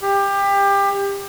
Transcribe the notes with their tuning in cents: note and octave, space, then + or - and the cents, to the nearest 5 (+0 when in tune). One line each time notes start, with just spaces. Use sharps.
G4 +25